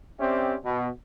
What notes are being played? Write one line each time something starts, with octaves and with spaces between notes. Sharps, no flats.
C4 C#4 G4 C5 D5 E5
B2